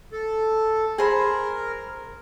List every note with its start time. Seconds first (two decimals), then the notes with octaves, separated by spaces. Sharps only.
0.12 A4
0.98 G#4 A#4 C5 B5